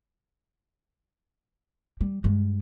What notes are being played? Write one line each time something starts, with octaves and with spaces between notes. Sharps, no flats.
G3
G2 G#3